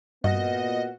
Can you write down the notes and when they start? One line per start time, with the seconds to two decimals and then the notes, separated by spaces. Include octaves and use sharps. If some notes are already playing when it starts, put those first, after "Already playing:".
0.24 G2 A#2 B3 F#4 D#5